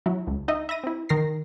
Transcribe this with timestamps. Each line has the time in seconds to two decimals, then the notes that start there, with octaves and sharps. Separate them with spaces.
0.06 F#3 E4
0.27 C#2
0.48 D#4 D#5 E5
0.69 E5 B5 A#6 D#7
0.84 C4 E4
1.09 D#3 A#4 A#6 C7